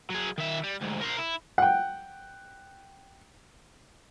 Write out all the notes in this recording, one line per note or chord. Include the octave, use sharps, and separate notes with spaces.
F#3 G#4
D#3 E5
G3
D2 G#2
A#4 C5
E4
F#5 G5